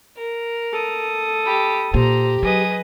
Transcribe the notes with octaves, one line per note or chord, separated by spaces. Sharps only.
A#4
A4 D#6
G4 B5
A#2 G4 C5 A#5
F#3 G#4 B4 D#5 D#6